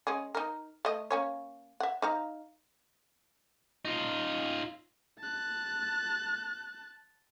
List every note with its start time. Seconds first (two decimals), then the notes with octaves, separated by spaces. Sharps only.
0.07 G#3 C#4 G#4
0.35 D#4 A#4
0.85 A3 D#5
1.10 A#3 C#4 C#5
1.80 E5 F#5
2.02 D#4 F5 A#5
3.85 D#4 F4
5.20 A5 F#6